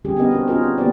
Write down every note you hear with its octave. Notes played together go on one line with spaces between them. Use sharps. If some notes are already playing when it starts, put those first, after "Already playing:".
D3 G3 C#4 G4 G#4
B3 C#4 D4 G4 A#4 D#5
C4 F#4 A#4
C#4 D#4 F4 F#4 G#4 A#4
C4
E3 A#3 B3 G4 B4 D5